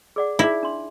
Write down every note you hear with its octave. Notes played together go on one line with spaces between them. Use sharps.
G#4 D5 F#5
D#4 E4 G#4
D4 C6